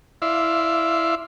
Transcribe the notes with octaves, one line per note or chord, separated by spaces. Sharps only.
E4 D5 E5 F5 C6